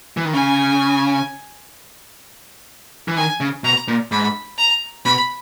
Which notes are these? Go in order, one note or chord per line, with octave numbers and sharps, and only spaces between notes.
E3
D#3
C#3 G#5
E3
D#3 G#5
C#3
B2 A#5
A#2
G#2 B5
A#5
B2 B5